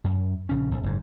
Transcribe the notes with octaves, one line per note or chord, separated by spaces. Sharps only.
F#2
A#1 C#3 C#4
A#1
F#1 G#2